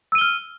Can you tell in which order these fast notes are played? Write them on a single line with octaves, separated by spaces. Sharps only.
E6 D#7 G7 F6